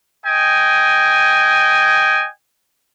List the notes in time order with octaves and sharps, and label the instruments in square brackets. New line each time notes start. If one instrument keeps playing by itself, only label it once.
[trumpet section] D#5 G5 G#5